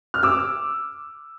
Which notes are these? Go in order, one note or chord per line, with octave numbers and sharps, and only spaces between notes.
F6
D6 E6